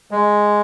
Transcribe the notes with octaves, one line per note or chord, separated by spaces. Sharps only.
G#3